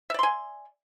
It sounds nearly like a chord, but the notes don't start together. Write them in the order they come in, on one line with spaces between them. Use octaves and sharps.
E5 D5 C6 G#5